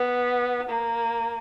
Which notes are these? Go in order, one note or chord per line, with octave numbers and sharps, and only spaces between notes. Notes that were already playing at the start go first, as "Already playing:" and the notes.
Already playing: B3
A#3